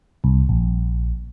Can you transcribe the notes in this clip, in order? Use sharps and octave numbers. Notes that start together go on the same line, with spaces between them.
C2
A#1